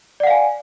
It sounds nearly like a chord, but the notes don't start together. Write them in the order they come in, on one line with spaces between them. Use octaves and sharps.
D5 F#5 F5 G#5